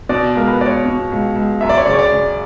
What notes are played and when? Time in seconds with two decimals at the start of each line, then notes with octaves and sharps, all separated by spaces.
0.09 B2 D5
0.35 C#2 A#4
0.48 B4
0.61 C#2 D5
0.66 C#5
0.86 B2
1.11 C#2
1.36 C#2
1.61 F#2 E5
1.69 D5
1.78 C#5
1.86 C#3 D5
1.93 C#5
1.99 D5
2.12 C#3